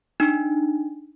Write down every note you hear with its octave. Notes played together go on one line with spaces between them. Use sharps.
D4 D#4